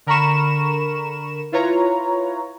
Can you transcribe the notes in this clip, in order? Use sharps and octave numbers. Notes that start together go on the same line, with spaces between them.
D3 A#4 A#5 B5 C#6 E7
E4 F4 B4 C#5 A#5